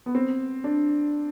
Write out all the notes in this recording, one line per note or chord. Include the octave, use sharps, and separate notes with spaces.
B3
C4
D4